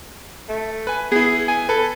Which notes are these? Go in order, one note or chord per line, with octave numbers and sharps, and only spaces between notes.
A3
B4 G#5
B3 E4 G#4
G#5
A4 B4